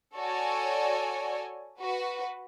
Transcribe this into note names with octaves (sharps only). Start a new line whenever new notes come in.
F#4 A4 C#5 D5 G#5
F#4 B4